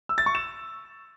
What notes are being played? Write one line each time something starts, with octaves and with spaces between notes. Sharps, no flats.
E6
A6
C#6
E7